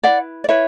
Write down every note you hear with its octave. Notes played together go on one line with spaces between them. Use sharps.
E4 B4 D5 F#5
D5
E4 B4 C#5 E5